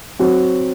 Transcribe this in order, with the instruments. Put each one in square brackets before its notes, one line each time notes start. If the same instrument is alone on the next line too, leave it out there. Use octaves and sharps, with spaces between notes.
[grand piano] F#3 C4 F#4